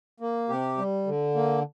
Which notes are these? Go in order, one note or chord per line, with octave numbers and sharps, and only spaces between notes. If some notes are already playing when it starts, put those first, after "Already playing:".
A#3
C3 G4
G3
D3
A#3